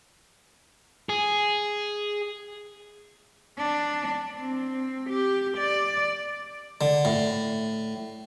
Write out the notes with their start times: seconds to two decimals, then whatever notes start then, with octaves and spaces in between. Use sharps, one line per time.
1.09 G#4
3.58 D4
4.35 C4
5.10 G4
5.58 D5
6.81 D3
7.05 A2